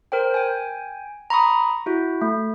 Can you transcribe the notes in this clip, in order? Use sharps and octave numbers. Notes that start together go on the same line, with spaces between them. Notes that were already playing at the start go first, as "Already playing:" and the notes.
A#4 C5 G5
G5 G#5
A#5 B5 C#6 D#6
E4 F#4
A3